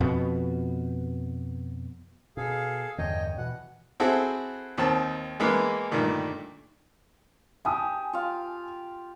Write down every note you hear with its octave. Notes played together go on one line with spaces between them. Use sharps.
F2 B2 B3
B2 G#4 A4 F5
E2 G2 D3 C#5 D#5 G5
B2 E3 F#5
C4 E4 F#4 G#4 A4
D#2 D#3 C4 A5
E3 G#3 A#3 B3
G2 A#2 D3 D#3 A3
G4 G#5 A5 D#6
F4 F5